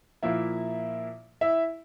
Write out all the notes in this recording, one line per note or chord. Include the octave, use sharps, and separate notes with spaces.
A#2 F3 A#3 E4 E5
E4 E5